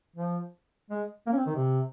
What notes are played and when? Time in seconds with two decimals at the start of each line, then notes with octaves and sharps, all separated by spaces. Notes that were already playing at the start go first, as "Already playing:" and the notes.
0.16 F3
0.90 G#3
1.27 A#3
1.32 C#4
1.37 C4
1.46 D#3
1.55 C3